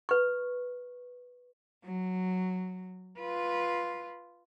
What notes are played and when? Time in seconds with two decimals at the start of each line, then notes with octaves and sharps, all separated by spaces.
0.09 B4 C#6
1.84 F#3
3.19 F4 B4